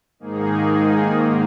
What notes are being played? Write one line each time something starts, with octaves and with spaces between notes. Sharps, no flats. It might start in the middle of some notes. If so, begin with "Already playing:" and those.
G#2 D#3 A#3 D#4 G#4
G#2 D#3 A#3